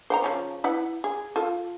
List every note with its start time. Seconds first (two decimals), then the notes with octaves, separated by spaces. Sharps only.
0.10 C5 F#5 A#5
0.22 C#3 F3 C#4
0.64 E4 B4 F#5
1.04 G#4
1.36 F4 A4